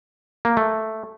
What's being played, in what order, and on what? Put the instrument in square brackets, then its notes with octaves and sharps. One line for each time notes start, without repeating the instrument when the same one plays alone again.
[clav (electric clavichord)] A#3
A3